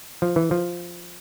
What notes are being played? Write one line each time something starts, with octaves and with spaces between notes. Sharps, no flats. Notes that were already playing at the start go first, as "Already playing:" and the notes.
F3
E3
F3